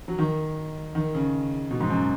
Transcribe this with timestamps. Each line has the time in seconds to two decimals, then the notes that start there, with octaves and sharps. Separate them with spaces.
0.08 F#3
0.19 D#3
0.95 D#3
1.15 C#3
1.71 B2
1.81 G#2
1.90 F#2